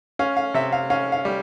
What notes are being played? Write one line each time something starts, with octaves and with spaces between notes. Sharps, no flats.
C#4 F5
F5
C3 E5
F5
C#4 F5
F5
G3